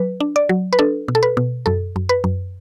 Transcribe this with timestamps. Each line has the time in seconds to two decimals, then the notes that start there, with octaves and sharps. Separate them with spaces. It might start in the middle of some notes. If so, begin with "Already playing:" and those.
Already playing: F#3 B4
0.20 D4
0.36 D5
0.49 F#3
0.73 B4
0.79 D4 A4
1.08 B2
1.15 A4
1.23 B4
1.37 B2
1.66 F#2 A4
1.96 F#2
2.09 B4
2.24 F#2